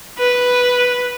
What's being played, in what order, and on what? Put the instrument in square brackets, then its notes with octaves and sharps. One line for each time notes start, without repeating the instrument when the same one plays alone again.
[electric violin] B4